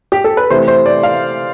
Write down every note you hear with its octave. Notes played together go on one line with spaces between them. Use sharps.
G4
A4
B4
C3 E3 A3 C5
C5
D5
F5